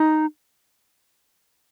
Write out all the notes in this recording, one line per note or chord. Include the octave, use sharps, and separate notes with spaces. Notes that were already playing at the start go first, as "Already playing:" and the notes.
Already playing: D#4